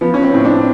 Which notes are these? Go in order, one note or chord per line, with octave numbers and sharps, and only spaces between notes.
F3 B3
C#4
C4
A2
C4 D4